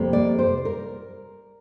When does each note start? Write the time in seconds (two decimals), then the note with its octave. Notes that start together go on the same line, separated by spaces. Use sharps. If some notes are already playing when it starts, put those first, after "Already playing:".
Already playing: F2 C3 G3 A#3
0.13 D5
0.38 C5
0.65 A#4